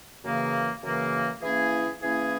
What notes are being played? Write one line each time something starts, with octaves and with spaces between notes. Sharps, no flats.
F#2 C#3 E3 A#3
F#2 C#3 E3 A#3
E3 A#3 C#4 E4 G#4
E3 A#3 C#4 E4 G#4